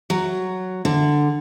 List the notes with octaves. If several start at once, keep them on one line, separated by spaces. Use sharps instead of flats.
F#3
D3